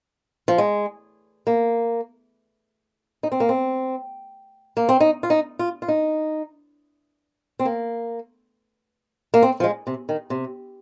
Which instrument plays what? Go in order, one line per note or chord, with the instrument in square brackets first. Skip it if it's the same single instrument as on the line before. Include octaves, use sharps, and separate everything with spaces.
[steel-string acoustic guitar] F3
G#3
A#3
D#4
C4
A#3
C4
A#3
C4
D#4
F4
D#4
F4
F4
D#4
C4
A#3
A#3
C4
F3
G#3
C3
D#3
C3